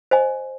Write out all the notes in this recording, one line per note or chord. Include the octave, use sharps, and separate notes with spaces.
C5 D#5 G#5